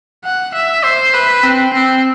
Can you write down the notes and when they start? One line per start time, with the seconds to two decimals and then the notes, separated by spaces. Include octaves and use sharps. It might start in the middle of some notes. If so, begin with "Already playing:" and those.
0.24 F#5
0.54 E5
0.84 C5
1.14 B4
1.43 C4
1.73 C4